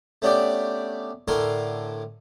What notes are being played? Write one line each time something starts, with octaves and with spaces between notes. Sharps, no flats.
A3 B3 C#4 D4 G4 D5
A2 D3 A#4 G#5 C6 C#6